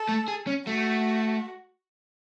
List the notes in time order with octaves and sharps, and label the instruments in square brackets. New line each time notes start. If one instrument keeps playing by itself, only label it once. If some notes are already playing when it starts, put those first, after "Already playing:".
Already playing: [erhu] A4
[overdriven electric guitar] A3
G#4
C#4
[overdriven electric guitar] A3 [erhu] F#4